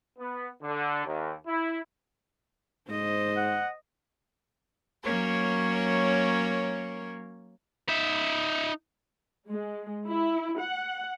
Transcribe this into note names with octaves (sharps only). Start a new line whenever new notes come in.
B3
D3
D#2
E4
G#2 C5 D#5
F#5
F#3 A#3 C#4 A#4 C#5
D#4 E5
G#3
E4
F#5